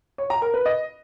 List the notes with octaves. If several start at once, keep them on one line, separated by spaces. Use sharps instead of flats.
C#5
A#5
A#4
B4
D#5